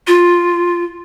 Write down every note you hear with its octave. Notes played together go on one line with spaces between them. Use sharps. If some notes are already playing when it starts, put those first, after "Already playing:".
F4